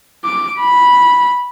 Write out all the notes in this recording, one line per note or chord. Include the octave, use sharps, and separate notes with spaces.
D6
B5